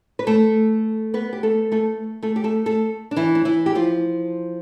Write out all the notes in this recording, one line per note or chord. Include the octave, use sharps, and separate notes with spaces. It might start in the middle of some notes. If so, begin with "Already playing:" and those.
B4
A3 A4
B3 B4
G4
A3 A4
A3 A4
A3 A4
G4
A3 A4
A3 A4
D4
E3 E4
D4
E3 E4
G4
F3 F4